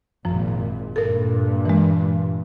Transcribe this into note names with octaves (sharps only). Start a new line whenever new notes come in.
G#1 F#2 A#2 F3
G2 A#2 A4 A#4
E3 G#3